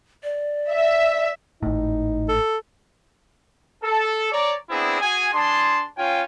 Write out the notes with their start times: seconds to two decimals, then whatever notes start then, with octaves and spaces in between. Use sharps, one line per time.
0.23 D5
0.72 E5
1.63 G#1 A2 D#4
2.29 A4
3.84 A4
4.32 C#5 D5 A#5 D6
4.70 B3 C4 D4 E4 G#4
5.01 F#4 G#4 G#5
5.34 D4 G#4 A5 C6
5.98 C#4 F4 C#5 G5 G#5